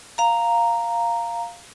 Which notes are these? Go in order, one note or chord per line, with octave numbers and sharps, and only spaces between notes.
F5 A#5